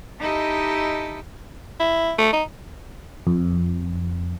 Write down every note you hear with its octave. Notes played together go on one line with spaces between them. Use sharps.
D#4 E4 G4 A4 D#5
E4
A3
D#4
F2